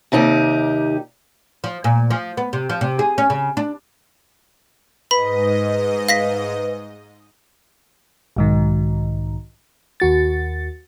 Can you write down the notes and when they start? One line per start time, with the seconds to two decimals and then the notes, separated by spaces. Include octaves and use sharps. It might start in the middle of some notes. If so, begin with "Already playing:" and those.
0.12 D#2 C3 D#4 G4
1.64 F3
1.84 A#2
2.10 F3
2.37 B3
2.53 C3
2.69 F3
2.81 C3
2.99 G#4
3.18 C#4
3.30 C#3
3.57 D4
5.11 G#2 B4 D#5 B5
6.09 F5 A#6 B6
8.36 B1 G#2 D#3
10.00 D#2 F#4 A6